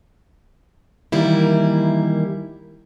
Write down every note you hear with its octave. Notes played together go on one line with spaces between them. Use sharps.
D#3 E3 G3 A#3 E4